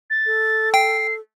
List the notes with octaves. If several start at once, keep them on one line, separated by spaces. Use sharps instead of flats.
A6
A4
G5 C7